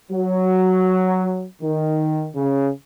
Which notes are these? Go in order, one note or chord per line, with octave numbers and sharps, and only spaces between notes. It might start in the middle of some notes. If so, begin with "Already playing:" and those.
F#3
D#3
C#3